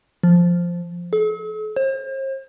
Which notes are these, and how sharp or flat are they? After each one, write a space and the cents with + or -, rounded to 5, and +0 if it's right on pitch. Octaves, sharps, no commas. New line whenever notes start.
F3 +0
A4 -45
C5 +40